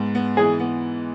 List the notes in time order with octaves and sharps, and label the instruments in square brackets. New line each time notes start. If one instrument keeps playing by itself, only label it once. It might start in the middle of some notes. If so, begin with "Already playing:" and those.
Already playing: [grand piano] G#2 B3
B3
[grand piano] E3 [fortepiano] G#4
[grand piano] B3